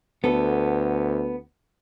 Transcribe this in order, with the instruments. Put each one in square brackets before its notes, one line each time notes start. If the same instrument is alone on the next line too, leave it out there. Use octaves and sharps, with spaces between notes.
[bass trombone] D2 [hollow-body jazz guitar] B3 A4